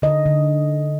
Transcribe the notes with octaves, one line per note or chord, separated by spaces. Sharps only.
D3 D#5
D3